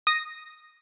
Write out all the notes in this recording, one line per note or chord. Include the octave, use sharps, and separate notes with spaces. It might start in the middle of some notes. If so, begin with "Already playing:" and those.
D#6 A#6